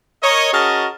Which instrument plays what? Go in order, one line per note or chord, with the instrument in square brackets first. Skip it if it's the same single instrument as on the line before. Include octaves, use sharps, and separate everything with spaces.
[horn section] A#4 C#5 D#5
C#4 F#4 G#4 A#4 D#5 A5